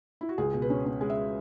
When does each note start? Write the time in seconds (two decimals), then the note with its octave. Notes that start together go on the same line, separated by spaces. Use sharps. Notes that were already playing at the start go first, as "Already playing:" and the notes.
0.21 E4
0.29 F#4
0.38 C#2 G#4
0.53 B2
0.62 B4
0.70 C#4
0.86 C#4
1.01 G#3
1.10 E5